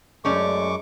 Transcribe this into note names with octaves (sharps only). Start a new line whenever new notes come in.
F#2 G#3 A3 C#4 D5 C#6 D6